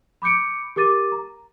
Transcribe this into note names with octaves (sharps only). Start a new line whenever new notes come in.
B5 D6 G6 C#7 D7
G4 A#4 D6 A6 D#7
A#5